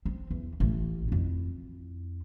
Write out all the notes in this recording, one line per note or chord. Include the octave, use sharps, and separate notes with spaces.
C4
E2
A1
F2 E4